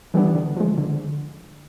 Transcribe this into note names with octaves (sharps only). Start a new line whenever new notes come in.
E3 G3 B3 D4
D3
F3 G#3
D3